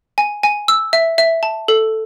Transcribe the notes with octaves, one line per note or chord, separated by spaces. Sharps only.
G#5
G#5
E6
E5
E5
A5
A4